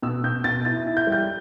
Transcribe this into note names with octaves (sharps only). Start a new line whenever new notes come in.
B2 E6
B2 G6
B2 A6
E4 A6
E4
G6
G3
G6